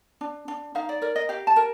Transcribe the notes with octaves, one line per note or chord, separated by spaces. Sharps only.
D4
D4
D#4 F5
D5
A#4 D5
D#5
G4 F5
A5
A#4